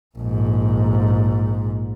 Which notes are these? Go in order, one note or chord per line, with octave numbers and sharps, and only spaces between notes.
A#1 G#2